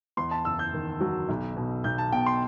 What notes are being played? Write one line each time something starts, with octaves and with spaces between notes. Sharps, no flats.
E2 C6
A5
F#1 E6
G6
D#3
F#3
B1
B2
B1 G6
A5
B2 G5
C6